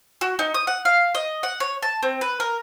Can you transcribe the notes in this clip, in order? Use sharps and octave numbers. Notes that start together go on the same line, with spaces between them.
F#4
D#4
D#6
F#5
F5
D#5
F#5
C#5
A5
C4
B4
A#4